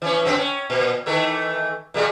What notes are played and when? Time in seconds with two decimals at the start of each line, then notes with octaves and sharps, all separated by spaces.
0.02 E3 C#4
0.25 F#2 B3 C4
0.38 C#4
0.70 A#2
1.06 D#3 E3 A3
1.94 A#2 G3 G#3